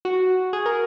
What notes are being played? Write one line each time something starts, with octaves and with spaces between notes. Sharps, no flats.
F#4
G#4
A#4